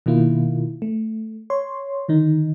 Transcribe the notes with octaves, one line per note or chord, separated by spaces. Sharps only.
B2 D#3 A#3 E4 F4
A3
C#5 C6
D3 D#3 D#4